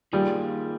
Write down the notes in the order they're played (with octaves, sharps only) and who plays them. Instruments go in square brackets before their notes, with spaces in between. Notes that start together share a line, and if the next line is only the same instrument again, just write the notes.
[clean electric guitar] D#3 A#3 F4 G#4 [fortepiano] G3